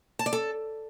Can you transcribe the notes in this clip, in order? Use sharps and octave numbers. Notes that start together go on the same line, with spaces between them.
A5
D5
A4